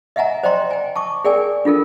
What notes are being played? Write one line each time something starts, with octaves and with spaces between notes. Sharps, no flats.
D#5 E5 F#5 G#5 A#5
C5 D5 D#5 G5 A#5 C6
G5 G#5
A5 C#6 D6
G#4 A#4 D5 G5 G#5
D4 F4 A4 A#4